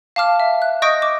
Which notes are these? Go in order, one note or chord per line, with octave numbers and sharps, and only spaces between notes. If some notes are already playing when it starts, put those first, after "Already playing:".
F5 A5 D6 F6
E5
F#6
D#5 C#6 D#6 G6 A#6 D7
D6